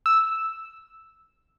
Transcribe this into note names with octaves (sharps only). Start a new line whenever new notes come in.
E6